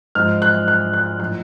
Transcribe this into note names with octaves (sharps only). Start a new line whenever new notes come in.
G#2 F3 F6
F#6
F#6
F#6
A2 F3 F#6